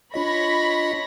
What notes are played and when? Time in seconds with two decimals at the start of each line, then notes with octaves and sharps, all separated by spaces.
0.14 D4 F4 C#5 D#5 B5 A#6